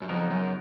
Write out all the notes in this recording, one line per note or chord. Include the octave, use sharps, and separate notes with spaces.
F#2
F2 C#3 F#3 B3 D#4 A#4
F#2